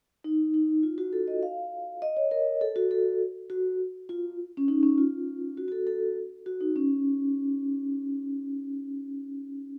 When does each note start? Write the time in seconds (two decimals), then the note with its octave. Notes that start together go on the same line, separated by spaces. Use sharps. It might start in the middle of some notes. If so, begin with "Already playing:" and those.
0.24 D#4
0.54 D#4
0.83 F4
0.98 F#4
1.13 A4
1.28 D#5
1.43 F5
2.02 D#5
2.17 C#5
2.31 A#4
2.61 A4
2.76 F#4
2.91 A4
3.50 F#4
4.09 F4
4.57 C#4
4.68 D#4
4.83 C#4
4.98 F4
5.57 F#4
5.68 F#4
5.72 A4
5.87 A4
6.46 F#4
6.61 D#4
6.76 C#4